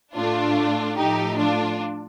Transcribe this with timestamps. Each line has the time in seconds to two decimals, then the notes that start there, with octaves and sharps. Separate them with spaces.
0.16 A2 A3 D4 F4
0.97 A2 F3 A3 D#4 G4
1.38 D4 F4